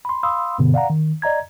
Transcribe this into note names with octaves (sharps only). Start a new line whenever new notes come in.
B5 C6
F5 B5 C6 D#6 E6
G2 B2 D3 B3
D5 F5 F#5 A#5
D#3
D5 D#5 A#5 G#6